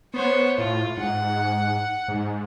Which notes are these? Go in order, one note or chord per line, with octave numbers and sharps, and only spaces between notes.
B3 C5 C#5
A2 F4
G#2 F#5
G#2